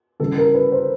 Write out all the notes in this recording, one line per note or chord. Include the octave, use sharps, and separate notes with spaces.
C#3 E3 G3 A4
A#4
B4
C5